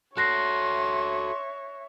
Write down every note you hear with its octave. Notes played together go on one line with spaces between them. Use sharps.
F#4 A4 C#5 E5 C6 F#6 A#6 C7